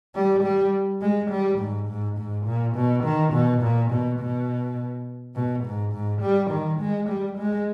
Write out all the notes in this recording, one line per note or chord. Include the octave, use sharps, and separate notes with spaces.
G3
G3
G#3
G3
G#2
G#2
G#2
A#2
B2
D#3
B2
A#2
B2
B2
B2
G#2
G#2
G3
D#3
G#3
G3
G#3